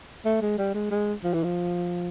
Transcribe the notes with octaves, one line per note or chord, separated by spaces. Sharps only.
A3
G#3
G3
G#3
G#3
F3
E3
F3